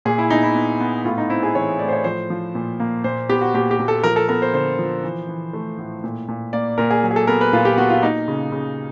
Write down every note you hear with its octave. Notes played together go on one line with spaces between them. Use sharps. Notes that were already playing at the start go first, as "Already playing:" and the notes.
A#2 G#4
E4
B3 D#4
E4
B3
B3
A2 F4
D#4
C4 E4
G#4
E3 C#5
A2 D5
C5
C#5
F3 C5
F3
A#2
A#3
A#2 C5
B3 G4
F#4
A#2 G4
G4
A#2
A4
F3 A#4
A4
B3 A#4
C5
D3 C5
F3
E3
E3
A3
A2
A#2
A#2
A#3 D5
A#2 A#4
G#4
F#3
G#4
A4
B3 A#4
B4
A#2 F4
G4
B3 F#4
F4
A#3 D#4
C#3
C#3